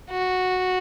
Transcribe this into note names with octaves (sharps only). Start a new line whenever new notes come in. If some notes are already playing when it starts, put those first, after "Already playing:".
F#4